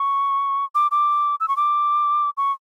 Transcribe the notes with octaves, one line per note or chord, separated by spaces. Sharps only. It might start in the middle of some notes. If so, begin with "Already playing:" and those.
Already playing: C#6
D6
D6
E6
C#6
D6
C#6